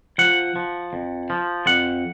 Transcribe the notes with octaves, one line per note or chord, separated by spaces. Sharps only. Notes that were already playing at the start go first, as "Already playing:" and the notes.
F3 F#5
F3
F2
F3
F2 F#5